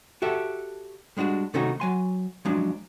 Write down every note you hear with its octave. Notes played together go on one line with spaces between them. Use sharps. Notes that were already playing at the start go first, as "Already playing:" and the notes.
F#4 G4 A4 E5
G3 G#3 D4 F4 F#4
C3 D#3 A3 C#4 D#4 F#4
F#3 G#5 C6
F3 F#3 G#3 C#4 D4